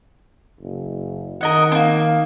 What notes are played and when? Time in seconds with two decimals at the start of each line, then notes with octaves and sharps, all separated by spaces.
0.61 F#1
1.41 D#3 A#4 D#5 F#5
1.72 A#3 C4